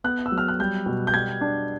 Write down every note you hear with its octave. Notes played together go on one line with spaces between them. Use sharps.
B3 F#6
E6
F#3
F6
F#6
G3 G6
B2
G6
G3 G#6
D4